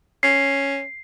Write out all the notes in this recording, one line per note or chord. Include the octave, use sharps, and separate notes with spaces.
C#4 C7